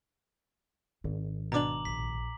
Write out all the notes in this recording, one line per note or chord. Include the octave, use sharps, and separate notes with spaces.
G#1 G#2
B2 D4 A#5 D6 F#7
A#1 B6